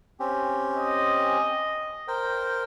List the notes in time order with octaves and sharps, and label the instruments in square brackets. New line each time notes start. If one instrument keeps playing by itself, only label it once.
[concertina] C4 C#4 G4
[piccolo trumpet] D#5
[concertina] A#4 C5 G5